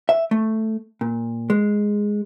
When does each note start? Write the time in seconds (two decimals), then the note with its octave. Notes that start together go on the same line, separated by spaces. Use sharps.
0.09 E5
0.31 A3
1.01 A#2
1.50 G#3